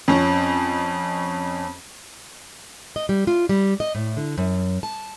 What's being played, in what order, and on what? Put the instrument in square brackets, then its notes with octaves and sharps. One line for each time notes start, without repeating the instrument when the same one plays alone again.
[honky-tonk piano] F2 C#4
[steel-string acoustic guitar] D#5
G3
F4
G3
D#5
A2
D3
F#2
A5